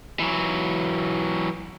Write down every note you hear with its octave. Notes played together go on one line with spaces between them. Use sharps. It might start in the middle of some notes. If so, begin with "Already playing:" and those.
E3 F#3